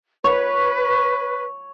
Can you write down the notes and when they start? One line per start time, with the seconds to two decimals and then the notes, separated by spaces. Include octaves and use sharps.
0.24 B4 C#5